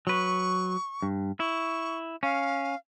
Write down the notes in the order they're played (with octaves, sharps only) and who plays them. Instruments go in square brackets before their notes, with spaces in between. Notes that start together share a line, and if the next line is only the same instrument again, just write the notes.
[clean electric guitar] F#3 B4 [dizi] C#6
[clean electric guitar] G2
[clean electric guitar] E4 [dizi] C#6
[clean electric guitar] C#4 [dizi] F5